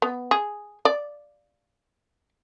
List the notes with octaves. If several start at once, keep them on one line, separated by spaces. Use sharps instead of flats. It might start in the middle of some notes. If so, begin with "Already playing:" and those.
B3
G#4
D5